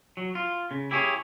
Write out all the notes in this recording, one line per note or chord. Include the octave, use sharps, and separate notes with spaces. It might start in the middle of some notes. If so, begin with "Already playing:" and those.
F#3
F4
C#3
E4 G4 G#4 C5 C#5